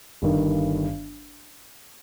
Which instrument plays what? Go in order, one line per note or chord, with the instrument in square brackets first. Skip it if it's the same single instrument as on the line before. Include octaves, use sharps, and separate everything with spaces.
[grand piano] G1 G2 D#3